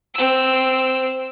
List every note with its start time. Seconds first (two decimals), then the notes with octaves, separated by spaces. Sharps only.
0.14 C4 E6